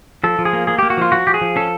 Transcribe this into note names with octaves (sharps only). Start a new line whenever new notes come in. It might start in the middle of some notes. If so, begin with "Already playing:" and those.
F3 A4
F3
G#4
A#3
A#3 G#4
A#3 G4
F#4
F3 F4
F3 F#4
F3 G4
G#4
F3
C#4 A4